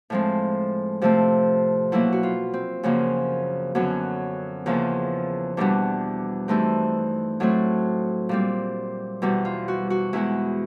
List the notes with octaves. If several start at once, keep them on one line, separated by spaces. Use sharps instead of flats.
A2 F3 G#3 C4
C3 F3 A3 C4
B2 F#3 A#3 E4
F#4
F4
C4
F#2 C#3 F3 A#3
F#2 D3 F#3 B3 C#4
E2 C#3 F3 A#3
E2 B2 G3 B3 D4
G2 E3 A3 C4 D#4
A2 F#3 A3 C4
A#2 G3 C4
E2 B2 G3
F4
F#4
F#4
E2 B2 G#3 B3 E4